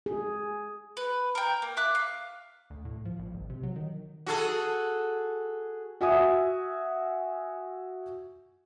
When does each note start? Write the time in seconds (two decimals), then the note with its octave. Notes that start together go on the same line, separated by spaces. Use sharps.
0.06 G#4
0.97 B4
1.35 A#4 G5
1.62 A#3
1.77 E5 D6 F#6
1.95 F5
2.70 D2
2.85 A2
3.05 F3
3.19 A#1
3.34 G#1
3.50 C3
3.63 F#3
3.76 D#3
4.26 F#4 G#4 A4
6.01 F#4 E5 G#5 D#6